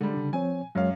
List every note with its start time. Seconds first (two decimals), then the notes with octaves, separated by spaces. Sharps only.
0.01 D3 G3 G#3
0.14 C#3 D4
0.33 F3 C4 C#5 G#5
0.75 F#2 F#3 G#3 C#5 F5